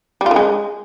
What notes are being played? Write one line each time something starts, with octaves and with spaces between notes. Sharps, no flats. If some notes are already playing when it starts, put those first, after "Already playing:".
G3
F4
D#3
G#3